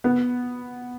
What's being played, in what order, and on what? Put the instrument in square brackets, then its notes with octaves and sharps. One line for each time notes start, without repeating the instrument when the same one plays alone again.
[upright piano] B3